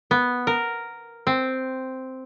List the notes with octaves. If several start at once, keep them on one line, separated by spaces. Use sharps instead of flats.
B3
A#4
C4